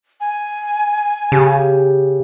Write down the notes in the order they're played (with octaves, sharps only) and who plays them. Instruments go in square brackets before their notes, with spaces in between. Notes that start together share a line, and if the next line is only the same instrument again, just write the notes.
[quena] G#5
[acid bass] C#3 [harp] G4